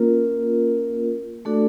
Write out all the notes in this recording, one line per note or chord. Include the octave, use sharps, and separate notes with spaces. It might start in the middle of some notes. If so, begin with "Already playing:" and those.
Already playing: A#3 C#4 F4 A#4
A3 D4 F#4 A4 D5